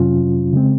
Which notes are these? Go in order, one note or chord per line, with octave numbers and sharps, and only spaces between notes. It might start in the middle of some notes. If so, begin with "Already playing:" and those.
Already playing: F2 C3 F#3 C#4 F4
C#3 G#3 C4